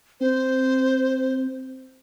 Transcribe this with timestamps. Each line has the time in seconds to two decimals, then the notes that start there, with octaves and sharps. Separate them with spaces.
0.21 C4 C5